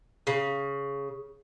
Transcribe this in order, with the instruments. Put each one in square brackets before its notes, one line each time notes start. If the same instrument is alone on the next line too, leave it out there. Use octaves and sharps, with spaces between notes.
[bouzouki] C#3